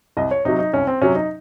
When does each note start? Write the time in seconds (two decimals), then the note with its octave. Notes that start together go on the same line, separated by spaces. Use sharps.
0.17 C2 D#5
0.31 C#5
0.45 C3 F#3 D#4
0.59 D#4
0.73 C2 C#4
0.87 C4
1.01 C3 F#3 C#4
1.15 D#4